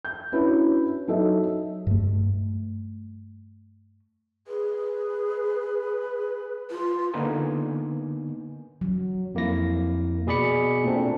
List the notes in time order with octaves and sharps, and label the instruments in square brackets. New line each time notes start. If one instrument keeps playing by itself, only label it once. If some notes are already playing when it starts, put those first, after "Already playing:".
[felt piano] G6
C#4 D4 E4 F#4 B4 C#5
F#3 D#4 F#4 A4 D#5 E5
[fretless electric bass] G2 A3
[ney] G#4 [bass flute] B4
[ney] F4
[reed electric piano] D3 A#3 B3 D#4 G#5
[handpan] F#3
[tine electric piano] F2 A#3 E4 A#6
B2 G#4 D5 B5 C#7
A#2 A3 C4 D4